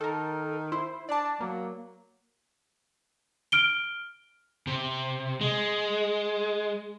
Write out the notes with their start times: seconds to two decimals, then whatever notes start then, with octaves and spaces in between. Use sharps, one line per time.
0.01 D#3 A4 A#4
0.72 E4 C5
1.09 D4 D5 A5
1.40 F#3 A#3
3.52 F6 D7 G7
4.67 C3
5.41 G#3